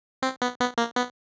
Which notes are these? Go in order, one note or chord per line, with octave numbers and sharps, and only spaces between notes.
C4
B3
B3
A#3
B3